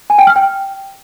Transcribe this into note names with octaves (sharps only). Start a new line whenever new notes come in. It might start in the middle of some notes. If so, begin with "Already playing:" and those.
G#5
G5
F6
G5